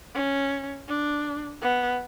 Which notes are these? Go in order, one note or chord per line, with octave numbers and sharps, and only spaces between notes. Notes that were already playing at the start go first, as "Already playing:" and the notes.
C#4
D4
B3